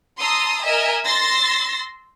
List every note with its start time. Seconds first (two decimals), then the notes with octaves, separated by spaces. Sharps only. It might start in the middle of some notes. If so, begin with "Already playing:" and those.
0.19 A5 A#5 C6 D#6 E6
0.63 A#4 D#5 E5 G#5
1.05 C6 E6 A6 A#6 C7